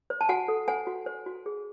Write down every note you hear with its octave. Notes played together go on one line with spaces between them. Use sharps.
C5
A5
F#4 F#5 G#5
A4
C5 F#5 G#5
F#4
C5
F#4
G#4